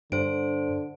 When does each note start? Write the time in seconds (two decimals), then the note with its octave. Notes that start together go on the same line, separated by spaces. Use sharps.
0.12 G2 D3 C5 D7